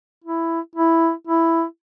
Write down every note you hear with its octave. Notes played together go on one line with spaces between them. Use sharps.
E4
E4
E4